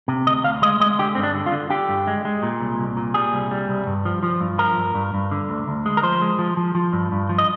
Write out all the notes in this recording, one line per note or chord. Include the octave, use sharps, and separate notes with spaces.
C3
D2 D#5
D2 F5
G#3 D#5
G#3 D#5
D3 G4
G2 C4
D4
D3
F4
D3
D3 G4
G2
G#3
G#3
A#2
C2
C2
A#2
G3 G#4
C2
G3
C2
G2
F3
F3
G2
F3 A#4
G2
G2
G2
D3
D2
D2
G#3
A#4
F3 C5
G#3
F3
F3
F3
G2
G2
F3
D#5